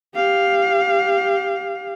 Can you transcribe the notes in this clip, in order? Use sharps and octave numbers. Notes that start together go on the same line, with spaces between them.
G4 F5